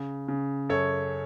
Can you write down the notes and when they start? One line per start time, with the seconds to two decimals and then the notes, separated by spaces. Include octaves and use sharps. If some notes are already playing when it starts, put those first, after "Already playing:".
Already playing: C#3
0.28 C#3
0.69 F#2 A4 C#5